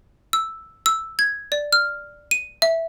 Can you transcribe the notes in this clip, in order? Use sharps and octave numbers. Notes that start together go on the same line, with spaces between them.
E6
E6
G#6
D5
F6
D#7
E5